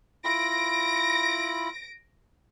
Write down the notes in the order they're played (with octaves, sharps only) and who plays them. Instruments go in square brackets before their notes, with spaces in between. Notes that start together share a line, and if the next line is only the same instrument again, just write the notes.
[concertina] E4 F4 B5 [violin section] A#6 D7